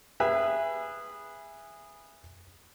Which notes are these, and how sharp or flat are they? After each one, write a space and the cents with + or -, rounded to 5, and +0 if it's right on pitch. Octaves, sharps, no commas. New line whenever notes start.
G#4 -15 B4 -10 E5 +15